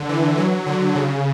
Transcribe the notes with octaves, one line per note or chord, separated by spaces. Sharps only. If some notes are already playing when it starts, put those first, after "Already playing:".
Already playing: D3
E3
F#3
D3
C#3